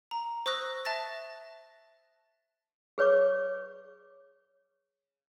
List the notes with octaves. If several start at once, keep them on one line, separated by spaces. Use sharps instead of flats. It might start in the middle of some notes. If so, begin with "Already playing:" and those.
A#5
C5 C#6 D#6 E6 F#6 A#6
E5 A5 F#6 A6 A#6
G#4 B4 C#5 C#6 D6